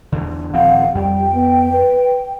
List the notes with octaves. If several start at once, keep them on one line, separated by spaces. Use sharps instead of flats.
E2 D3
D#1 F3 C4 F5 F#5
F2 G3 G5
B3
B4